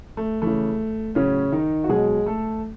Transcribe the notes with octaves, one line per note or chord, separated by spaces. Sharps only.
A3
C#3 E3 A3
A2 C#3 F#3 C#4
D#3 D#4
F#4
B2 F#3 G#3 G#4
A3 A4